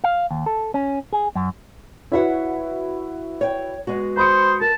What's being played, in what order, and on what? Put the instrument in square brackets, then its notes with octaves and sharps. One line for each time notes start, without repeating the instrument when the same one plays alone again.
[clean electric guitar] F5
D#2
A4
C#4
G#4
F#2
[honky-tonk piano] E4 F#4 B4 [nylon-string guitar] C#5 E5 F#5
[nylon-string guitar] C#5 G5
G#3 B3 F#4
[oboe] C5 [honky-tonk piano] B5 D#6 C#7
[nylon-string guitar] A#4 [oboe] A5